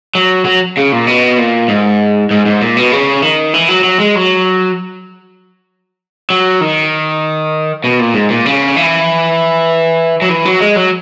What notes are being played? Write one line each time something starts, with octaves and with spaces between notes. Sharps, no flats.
F#3
F#3
C#3
A#2
B2
A#2
G#2
G#2
G#2
A#2
B2
C#3
D#3
E3
F#3
F#3
G#3
F#3
F#3
D#3
B2
A#2
G#2
A#2
C#3
E3
F#3
E3
F#3
G#3
F#3